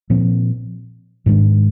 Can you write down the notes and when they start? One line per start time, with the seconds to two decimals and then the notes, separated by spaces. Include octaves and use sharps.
0.10 A#2 F3 C4
1.26 G#2 D#3 G#3 D4